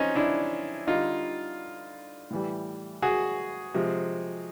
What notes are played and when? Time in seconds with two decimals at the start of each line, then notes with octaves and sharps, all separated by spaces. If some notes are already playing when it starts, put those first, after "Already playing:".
Already playing: F3 G#3 C4 C#4 D#4
0.15 D4 E4
0.87 D3 G3 D#4 F4
2.30 A2 E3 G3
3.02 F#4 G#4
3.74 C3 F3 G#3